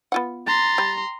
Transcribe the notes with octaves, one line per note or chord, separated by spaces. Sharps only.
B3 F4 F#5
A#5 C6 A6
G3